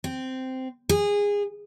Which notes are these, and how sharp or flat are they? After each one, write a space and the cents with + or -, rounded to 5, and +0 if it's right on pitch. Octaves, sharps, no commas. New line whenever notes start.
C4 -10
G#4 -20